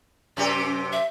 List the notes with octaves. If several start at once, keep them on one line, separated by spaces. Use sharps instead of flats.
F#2 C3 G4 D5
C#4
E5